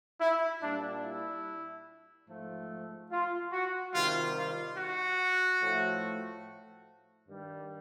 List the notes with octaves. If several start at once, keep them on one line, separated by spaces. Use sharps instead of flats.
E4
A#2 G3 D4
E4
G#2 F3 A3
F4
F#4
C3 D#3 G3 F4
F4
F#4
A2 F3 A3
G2 D#3 G3